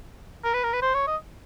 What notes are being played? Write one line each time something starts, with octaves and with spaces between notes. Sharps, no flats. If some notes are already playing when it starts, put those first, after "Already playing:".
A#4
B4
A#4
B4
C5
C#5
D#5